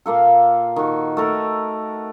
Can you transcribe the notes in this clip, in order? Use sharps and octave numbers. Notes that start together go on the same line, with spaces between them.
A#2 A#3 F4 A4
D#3 F#4
A3 A4 A#4